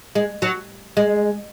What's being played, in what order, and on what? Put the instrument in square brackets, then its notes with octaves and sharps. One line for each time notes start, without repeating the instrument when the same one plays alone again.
[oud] G#3
F#3
G#3